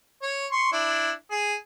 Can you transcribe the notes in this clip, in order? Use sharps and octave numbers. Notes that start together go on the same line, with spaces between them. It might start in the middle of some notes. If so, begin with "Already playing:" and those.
C#5
C6 C#6
D4 E4
G#4